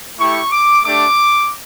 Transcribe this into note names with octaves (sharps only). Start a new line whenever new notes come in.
A3 E4 G4 C#6
D6
A3 D4 G4 D6